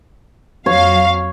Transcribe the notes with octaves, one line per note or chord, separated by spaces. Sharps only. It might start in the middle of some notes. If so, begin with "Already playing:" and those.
F2 F#3 C#5 F5